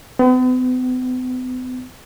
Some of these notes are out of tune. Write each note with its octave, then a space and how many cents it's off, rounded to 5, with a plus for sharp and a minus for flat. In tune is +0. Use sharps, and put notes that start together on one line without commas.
B3 +45